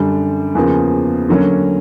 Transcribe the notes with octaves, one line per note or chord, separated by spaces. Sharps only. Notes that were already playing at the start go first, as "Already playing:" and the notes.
Already playing: F#2 D3 G3
E2 C#3 F3 A#3
D3 F#3 A#3 C#4